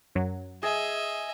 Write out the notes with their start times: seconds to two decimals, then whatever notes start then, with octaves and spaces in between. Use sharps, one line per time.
0.15 F#2 F#3
0.63 G#4 D#5 E5